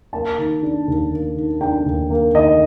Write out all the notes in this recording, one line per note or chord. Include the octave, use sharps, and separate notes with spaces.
A#3 A5
D#3
D4
D#2
A#3
D#3
D4 G5
D#2
A#3
D#3 D#5